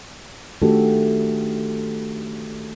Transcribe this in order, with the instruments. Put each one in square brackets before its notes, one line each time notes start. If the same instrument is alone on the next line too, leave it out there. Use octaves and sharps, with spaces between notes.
[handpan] D#3 A3 D4 F#4 G4 A4